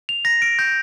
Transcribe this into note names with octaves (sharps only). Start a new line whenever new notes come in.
F7
A#6
D7
G6